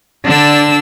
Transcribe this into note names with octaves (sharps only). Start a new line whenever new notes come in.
D3 D4 E6